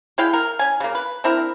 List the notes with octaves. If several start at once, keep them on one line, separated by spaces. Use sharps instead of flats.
G#3 E4 F5 G5
A#4
C#4 G#5
C#3 A#3
B4
C4 D4 E4 A#4